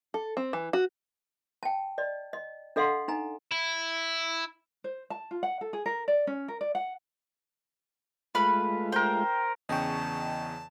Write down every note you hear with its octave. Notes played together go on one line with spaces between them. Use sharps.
A4
C4
E3
F#4
G5 A5
D5 D#5
D#5
D4 A4 D#5 F5 F#5 C6
D#4 G#5 A#5
E4
C5
A5
F4
F#5
A4
G#4
A#4
D5
C#4
A#4
D5
F#5
G#3 A3 F4 B4 B5 F6
A#4 C5 G5
E2 C#3 D#5 G5 A5 C#6